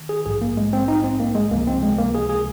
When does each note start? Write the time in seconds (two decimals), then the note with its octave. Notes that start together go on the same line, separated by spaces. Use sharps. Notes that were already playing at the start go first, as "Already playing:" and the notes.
Already playing: D#3
0.09 G#4
0.26 A#1 G#2 F3 G#4
0.41 A#3
0.57 G#3
0.73 C4
0.88 D#4
1.04 C4
1.20 A#3
1.35 G#3
1.51 C#2 C3 F3 A#3
1.67 C4
1.83 G#3
1.98 A#3
2.15 G#4
2.30 G#4